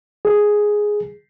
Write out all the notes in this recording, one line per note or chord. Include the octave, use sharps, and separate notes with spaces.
G#4